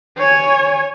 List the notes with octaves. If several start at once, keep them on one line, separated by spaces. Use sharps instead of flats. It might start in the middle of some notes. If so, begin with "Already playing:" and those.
C#5 G#5